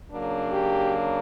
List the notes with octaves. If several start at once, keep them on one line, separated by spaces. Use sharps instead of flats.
C#3 F#3 A#3 D4
G4